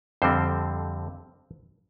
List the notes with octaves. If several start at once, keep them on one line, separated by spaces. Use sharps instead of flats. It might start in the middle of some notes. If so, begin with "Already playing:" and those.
F2 D3 G3 C4 C5